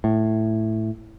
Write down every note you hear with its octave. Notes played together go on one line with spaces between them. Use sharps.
A2